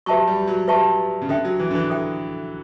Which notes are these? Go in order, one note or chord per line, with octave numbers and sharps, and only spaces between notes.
F#3 G4 B4 E5 A5 C#6
G3
F#3
G4 B4 E5 A5 C#6
C#3
D3 A4 E5 G5
F#3
E3
D3
E3
A4 E5 G5